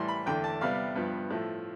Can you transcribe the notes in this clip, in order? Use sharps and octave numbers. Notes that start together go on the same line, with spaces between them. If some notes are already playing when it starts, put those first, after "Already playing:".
Already playing: A2 E3 G3 C6
B5
E2 D3 A3 G5
A5
C3 G3 B3 F5
G2 F3 B3
A2 F3 A3